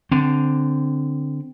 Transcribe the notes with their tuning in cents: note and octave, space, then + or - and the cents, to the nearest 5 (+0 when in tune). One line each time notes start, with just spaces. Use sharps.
D3 +0 C4 +0